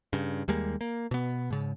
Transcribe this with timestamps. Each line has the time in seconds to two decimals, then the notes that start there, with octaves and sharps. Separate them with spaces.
0.13 G2 C#3
0.48 D#2 G3 G#3 A#3
0.81 A#3
1.11 B2 B3
1.50 G#2 C#3